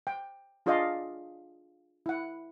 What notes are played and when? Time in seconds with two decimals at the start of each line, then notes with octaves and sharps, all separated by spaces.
0.07 G5
0.66 D4 F4 G#4 D5 D#5 F5
2.06 E4 F#5